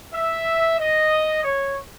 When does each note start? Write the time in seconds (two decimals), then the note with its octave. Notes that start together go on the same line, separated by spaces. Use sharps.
0.14 E5
0.78 D#5
1.44 C#5